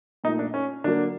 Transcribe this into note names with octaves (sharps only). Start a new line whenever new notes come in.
A#2 F3 A3 D#4
D4
C#4
D3 F#3 A#3 D4